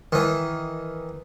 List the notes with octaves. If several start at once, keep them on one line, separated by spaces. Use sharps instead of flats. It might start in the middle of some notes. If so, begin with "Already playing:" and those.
D#3 E3